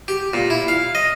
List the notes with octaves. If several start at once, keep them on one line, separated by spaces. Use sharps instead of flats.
G4
A#2
E4
F5
D#5